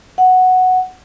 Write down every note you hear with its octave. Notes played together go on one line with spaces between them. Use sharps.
F#5